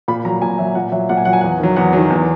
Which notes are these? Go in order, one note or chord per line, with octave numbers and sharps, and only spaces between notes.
A#2 B5
F#3 A#5
A#2 G#5
F#3 E5
A#2 F#5
F#3 E5
A#2 F#5
G#5
F#3 F#5
G#5
E2 F#5
D#3 F#3
E2 F#5
D#3 F#3
E2